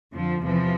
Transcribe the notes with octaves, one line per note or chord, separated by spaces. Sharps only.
F2 D3 F3
E2 C3 E3 F3